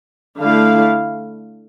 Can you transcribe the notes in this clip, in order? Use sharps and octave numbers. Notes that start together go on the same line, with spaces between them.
D3 A3 E4 F5